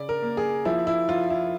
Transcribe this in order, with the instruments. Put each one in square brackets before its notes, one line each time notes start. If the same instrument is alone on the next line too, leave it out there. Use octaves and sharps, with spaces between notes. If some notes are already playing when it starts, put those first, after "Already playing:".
Already playing: [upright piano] C#3 D5
A#4
A#3
G#4
F3 E4
E4
F3 F4
E4